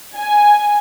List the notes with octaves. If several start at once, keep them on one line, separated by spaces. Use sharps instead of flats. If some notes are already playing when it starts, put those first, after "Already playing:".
G#5